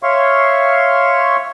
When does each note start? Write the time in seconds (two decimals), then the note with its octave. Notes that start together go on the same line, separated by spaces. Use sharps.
0.03 C#5 E5 F5 C6 C#6